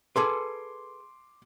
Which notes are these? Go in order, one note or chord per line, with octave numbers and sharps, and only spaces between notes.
G#4 A4 B4 C6 D6